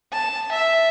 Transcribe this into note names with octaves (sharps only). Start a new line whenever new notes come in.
A5
E5